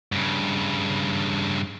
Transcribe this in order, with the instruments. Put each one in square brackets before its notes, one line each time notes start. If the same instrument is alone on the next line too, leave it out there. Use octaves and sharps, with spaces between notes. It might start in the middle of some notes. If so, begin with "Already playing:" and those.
[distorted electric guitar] G2 C#3